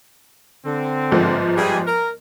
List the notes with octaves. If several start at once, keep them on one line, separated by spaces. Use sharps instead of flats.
D3 C4
G1 G#2 F3
G3 G#4
A#4